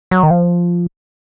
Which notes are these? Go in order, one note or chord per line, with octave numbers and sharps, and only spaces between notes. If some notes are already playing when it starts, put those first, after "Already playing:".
F#3
D#3
F3